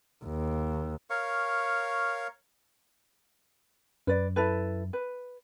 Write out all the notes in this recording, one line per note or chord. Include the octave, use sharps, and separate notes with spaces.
D#2
A#4 C#5 F5 C#6
F#2 B4 D5
E4 A4 B4
B4